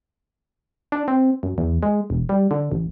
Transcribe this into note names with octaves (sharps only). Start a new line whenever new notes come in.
D4
C4
F#2
E2
G#3
E1
G3
D3
A1